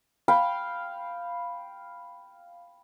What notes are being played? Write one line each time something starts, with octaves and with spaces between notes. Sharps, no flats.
F5 G5 B5